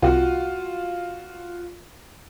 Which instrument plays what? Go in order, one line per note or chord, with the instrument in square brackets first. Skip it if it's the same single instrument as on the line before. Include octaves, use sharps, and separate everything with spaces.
[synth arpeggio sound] C2 [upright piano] F4 F#4